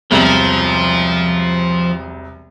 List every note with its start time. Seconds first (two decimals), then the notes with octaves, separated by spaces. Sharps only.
0.11 E1 C2 F3